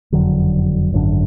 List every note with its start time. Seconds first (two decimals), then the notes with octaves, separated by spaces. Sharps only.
0.12 F#1 F2 D3 F#3
0.93 G#1 F#2 D3